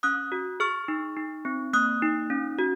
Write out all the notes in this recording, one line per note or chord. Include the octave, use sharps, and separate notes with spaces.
C#4 D#6 F#6
F#4
G#4 C#6 F6
D#4
D#4
C4
A#3 D#6 F#6
D#4
C#4
F#4